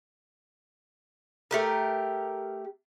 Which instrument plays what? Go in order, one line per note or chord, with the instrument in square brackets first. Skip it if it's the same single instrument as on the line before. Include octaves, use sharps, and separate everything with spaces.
[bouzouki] A3 G4 A#4